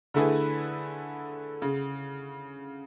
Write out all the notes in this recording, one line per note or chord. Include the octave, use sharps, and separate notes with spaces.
D3 A3 E4 G#4 B4
C#3